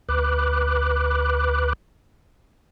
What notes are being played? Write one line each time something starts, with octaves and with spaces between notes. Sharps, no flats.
D2 B4 B5 D6 F#6